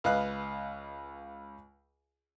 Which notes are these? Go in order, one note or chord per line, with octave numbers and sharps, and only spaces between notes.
C#2 B4 D#5 F5 F#6